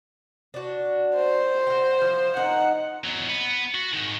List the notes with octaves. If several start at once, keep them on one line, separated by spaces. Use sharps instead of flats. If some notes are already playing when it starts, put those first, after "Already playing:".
D4 F#4
C5
F#4 G5
F3
D#4 A#4 F#5
E2 F#3
B3
F#4
G#2 D#3